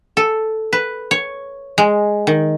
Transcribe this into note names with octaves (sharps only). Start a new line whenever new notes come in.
A4
B4
C#5
G#3
D#3